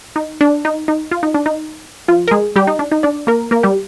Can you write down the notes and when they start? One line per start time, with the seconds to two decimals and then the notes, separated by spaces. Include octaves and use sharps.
0.16 D#4
0.41 D4
0.65 D#4
0.88 D#4
1.11 F4
1.23 D#4
1.34 D4
1.46 D#4
2.08 F3 F4
2.28 A#4
2.31 G#3 G#4
2.56 G3 G4
2.67 D#4
2.79 D4
2.92 D#4
3.03 D4 D5
3.27 A#3 A#4
3.51 A#3 A#4
3.63 G3 G4